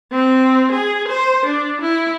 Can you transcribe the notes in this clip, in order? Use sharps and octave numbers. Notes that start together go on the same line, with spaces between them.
C4
G#4
C5
D4
E4